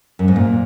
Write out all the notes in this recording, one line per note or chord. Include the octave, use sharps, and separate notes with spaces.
F#2
G#2
A#2